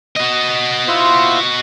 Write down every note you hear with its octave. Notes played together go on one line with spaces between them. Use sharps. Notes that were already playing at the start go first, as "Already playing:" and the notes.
F#4 D#5
E4 F4 C5